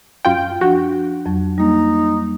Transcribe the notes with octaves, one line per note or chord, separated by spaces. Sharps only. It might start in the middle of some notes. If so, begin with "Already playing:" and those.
F#2 F4 G5
F3 D4 F#4
F2 F#3
G3 A#3 D#4